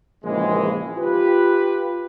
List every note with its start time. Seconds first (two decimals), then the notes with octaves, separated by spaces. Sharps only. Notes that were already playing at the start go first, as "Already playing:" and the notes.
0.24 A#1 D#2 C#3 E3 G#3
0.96 F4 G4 B4